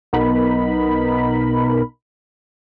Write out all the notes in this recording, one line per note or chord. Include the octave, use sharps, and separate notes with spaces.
B1 B3 D#4 A#4 B5